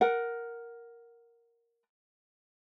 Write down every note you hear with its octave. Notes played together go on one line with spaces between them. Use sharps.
A#4 F#5